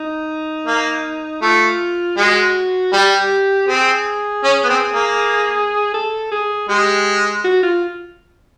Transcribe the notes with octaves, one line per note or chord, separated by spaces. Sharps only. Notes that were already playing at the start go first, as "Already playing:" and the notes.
Already playing: D#4
A#3
A3 F4
G#3 F#4
G3 G4
C4 G#4
C#4
B3
C4
A#3
A4
G#4
G#3 G4
F#4
F4